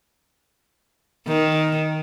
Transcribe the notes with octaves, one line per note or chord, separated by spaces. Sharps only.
D#3